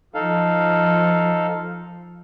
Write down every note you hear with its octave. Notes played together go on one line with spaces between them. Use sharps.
F3 D#4 A4 F5